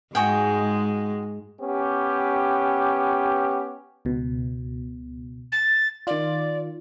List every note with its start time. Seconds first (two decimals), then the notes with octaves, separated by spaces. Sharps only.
0.15 G#2 G#3 F#4 G#4 G5
1.60 B3 C#4 G4
4.05 C#2 B2
5.52 A6
6.07 D#3 F4 D5